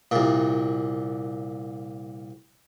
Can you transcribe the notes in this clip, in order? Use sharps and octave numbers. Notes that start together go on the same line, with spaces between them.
C2 A#2